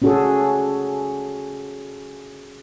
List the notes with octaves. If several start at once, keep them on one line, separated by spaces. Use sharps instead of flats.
C#4 D4 F#4 G#4 A4